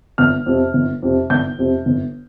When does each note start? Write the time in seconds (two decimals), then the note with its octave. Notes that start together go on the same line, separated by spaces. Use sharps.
0.18 G1 F6
0.46 F2 C3
0.74 G1
1.02 F2 C3
1.30 G1 G6
1.59 F2 C3
1.86 G1